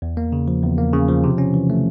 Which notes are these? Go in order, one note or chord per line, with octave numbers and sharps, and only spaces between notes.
E2
A#3
C#3
F3
E2
A#3
C#3
F3
C3
C#4
E3
A3